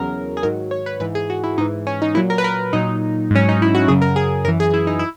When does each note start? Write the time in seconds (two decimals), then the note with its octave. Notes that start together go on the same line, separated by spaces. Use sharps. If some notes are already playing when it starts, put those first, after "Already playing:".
Already playing: E2 C#3 F#3 A#4
0.37 G#4
0.43 G#2 D#3 F#3 A#4
0.71 C#5
0.86 B4
1.00 G#2 E3 B4
1.15 G#4
1.30 F#4
1.44 E4
1.58 G#2 E3 D#4
1.87 C#4
2.02 D#4
2.15 A#2 F#3 E4
2.30 A#4
2.38 B4
2.44 A#4
2.73 A#2 F#3 D#4
3.31 G#2 F#3 C#4
3.49 D#4
3.62 E4
3.75 F#4
3.87 F#2 C#3 F#3 G#4
4.02 A#4
4.16 G#4
4.45 F#2 E3 A#4
4.60 G#4
4.74 E4
4.87 D#4
4.99 E4